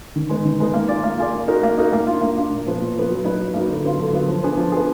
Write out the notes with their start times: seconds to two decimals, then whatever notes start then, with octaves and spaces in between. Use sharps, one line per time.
0.16 D#3
0.29 G#3 B3 D#4
0.45 D#3
0.60 G#3 B3 D#4
0.74 A#3
0.88 F4 G#4 D5
1.04 A#3
1.18 F4 G#4 D5
1.33 A#3
1.47 D#4 F#4 A#4
1.63 A#3
1.78 D#4 F#4 A#4
1.93 A#3
2.07 F4
2.12 D4
2.22 A#3
2.37 D4 F4
2.51 A#2
2.66 F3 B3
2.80 A#2
2.95 F3 B3
3.11 F#3
3.24 A#3 D#4 F#4 B4
3.40 F#3
3.54 A#3 D#4 F#4 B4
3.69 D3
3.84 F#3 B3 F4
3.99 D3
4.13 F#3 B3 F4
4.28 F3
4.43 B3 D4 G#4
4.57 F3
4.72 B3 D4 G#4